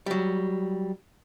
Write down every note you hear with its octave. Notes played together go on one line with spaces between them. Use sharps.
F#3 G3